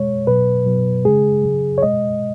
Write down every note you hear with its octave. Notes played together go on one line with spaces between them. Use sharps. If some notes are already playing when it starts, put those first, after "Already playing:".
Already playing: B2 G#3 C#5
B2 F#3 B4
B2 F#3
C#3 G#3 G#4
C#3 F#3
C#5
B2 G#3 D#5